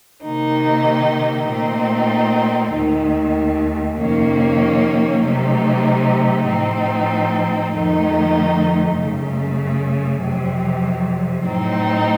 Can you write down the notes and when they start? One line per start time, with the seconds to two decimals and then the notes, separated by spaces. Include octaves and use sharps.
0.24 C3 D#3 A#3 D#4
1.48 A#2 A3 C4 D#4
2.73 D#2 D#3 A3
3.98 F2 C3 D#3 A#3 C#4
5.22 C3 F#3 A3 D#4
6.47 A2 F3 C4 D#4
7.72 F2 D#3 A3 D#4
8.96 F#2 C#3 A3
10.21 F2 C3 F#3
11.45 A2 F#3 C4 D#4